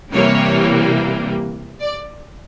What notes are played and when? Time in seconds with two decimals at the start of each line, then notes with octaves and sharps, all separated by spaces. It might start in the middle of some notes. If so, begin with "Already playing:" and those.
0.13 C3 E3 G3 A#3 C#5
1.81 D5